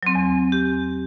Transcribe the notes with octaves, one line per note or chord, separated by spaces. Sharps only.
F#3 C4
E2
G4